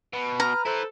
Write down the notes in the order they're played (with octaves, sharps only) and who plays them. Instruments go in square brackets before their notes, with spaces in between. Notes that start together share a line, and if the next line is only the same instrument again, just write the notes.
[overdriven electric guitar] B2 [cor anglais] B4
[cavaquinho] A#5 [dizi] F6
[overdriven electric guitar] E4 B4 [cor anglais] A4 [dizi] C5